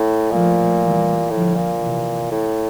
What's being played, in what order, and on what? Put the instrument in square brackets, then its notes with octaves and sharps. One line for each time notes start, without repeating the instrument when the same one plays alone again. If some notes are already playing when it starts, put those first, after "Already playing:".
Already playing: [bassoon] A2
[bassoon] A#2 [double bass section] F3 A3
[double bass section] E3 G3
[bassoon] A2 [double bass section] D3 F3
[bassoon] A#2
[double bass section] C3 E3
[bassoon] A2